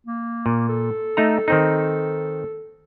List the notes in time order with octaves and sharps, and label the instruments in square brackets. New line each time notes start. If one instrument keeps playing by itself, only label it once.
[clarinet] A#3
[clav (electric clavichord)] A#2
[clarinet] A4
[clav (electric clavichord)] A3 D#4 A#5
D#3 C4 D#4